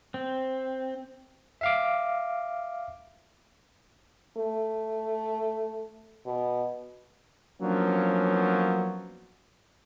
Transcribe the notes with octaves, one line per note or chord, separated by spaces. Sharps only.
C4
E5 F5 D6
A3
B2
F3 F#3 A#3 B3 C#4 D4